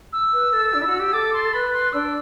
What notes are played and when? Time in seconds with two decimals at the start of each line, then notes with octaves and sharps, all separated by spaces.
0.13 E6
0.33 B4
0.53 A4
0.73 D4
0.81 E4
0.86 F#4
0.99 G4
1.13 A4 D6
1.33 C6
1.53 B4 B5
1.74 C6
1.93 D4 E6